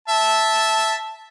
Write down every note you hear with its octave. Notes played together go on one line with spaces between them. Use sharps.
E5 A5